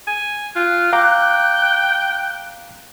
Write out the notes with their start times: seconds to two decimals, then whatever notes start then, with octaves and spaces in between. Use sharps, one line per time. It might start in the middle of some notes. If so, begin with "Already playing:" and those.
0.07 G#5
0.56 F4 F#6
0.93 F5 G5 A#5 D6